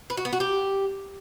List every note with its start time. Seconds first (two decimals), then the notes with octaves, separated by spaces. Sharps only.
0.10 B4
0.17 F#4
0.25 B3
0.33 F#4
0.40 G4